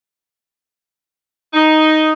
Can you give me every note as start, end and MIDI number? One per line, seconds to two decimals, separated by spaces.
1.54 2.11 63